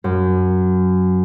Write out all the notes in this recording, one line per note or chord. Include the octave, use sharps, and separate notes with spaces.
F#2